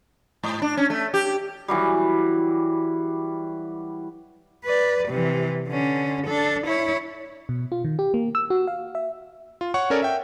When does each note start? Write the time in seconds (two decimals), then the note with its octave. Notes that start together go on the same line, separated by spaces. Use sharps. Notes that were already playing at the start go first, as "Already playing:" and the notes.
0.43 G#2
0.62 D4
0.77 C#4
0.90 A3
1.14 G4
1.68 E3 F#3 G3
4.64 B4 D5
5.08 C3 E3
5.68 D3 C#4
6.27 D4 A4
6.66 E4 C#5
7.49 B2
7.72 F4
7.85 D#3
7.99 G4
8.14 A#3
8.35 E6
8.50 F#4
8.67 F5
8.95 E5
9.61 F4
9.74 C#5 F#5 C#6
9.90 C#4 A4 A#4 C#5 D5
10.02 E5 G5